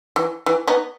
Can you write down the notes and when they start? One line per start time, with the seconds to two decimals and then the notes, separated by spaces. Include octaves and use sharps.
0.16 E3
0.46 E3
0.67 B3 D#4